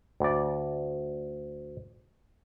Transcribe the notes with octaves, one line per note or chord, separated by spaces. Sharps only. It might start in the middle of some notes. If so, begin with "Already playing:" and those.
D2 D5